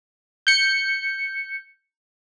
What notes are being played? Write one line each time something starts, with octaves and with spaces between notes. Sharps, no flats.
G6 C#7